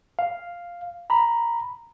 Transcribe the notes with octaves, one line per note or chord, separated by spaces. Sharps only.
F5
A#5 B5